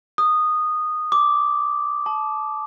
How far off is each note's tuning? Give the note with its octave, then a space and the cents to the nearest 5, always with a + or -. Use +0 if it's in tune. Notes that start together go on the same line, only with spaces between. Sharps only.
D#6 -15
D6 -5
A5 -25